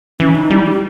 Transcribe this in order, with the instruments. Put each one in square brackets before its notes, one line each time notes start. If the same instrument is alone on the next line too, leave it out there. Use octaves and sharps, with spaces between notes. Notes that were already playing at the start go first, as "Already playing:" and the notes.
[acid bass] E3 [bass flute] C#4
[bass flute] D#4
[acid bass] G3 [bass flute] E4
[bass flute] G4